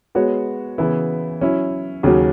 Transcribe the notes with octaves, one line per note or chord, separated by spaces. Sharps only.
G#3 B3 F#4 C#5
C#3 E3 B3 E4 B4
F#3 C#4 E4
D#2 C#3 F#3 C#4 F#4